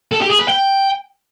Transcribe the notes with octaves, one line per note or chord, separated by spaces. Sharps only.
A4
G4
G#4
B4
G5